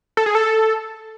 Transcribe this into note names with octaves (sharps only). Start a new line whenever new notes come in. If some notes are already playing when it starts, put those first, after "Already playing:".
A4
G#4
A4